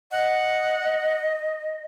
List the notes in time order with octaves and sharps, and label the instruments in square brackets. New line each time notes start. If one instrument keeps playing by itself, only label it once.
[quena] D#5 [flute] F#5